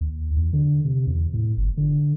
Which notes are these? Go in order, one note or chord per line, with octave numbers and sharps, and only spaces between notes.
D#2
E2
D3
C3
E2
A2
G1
D3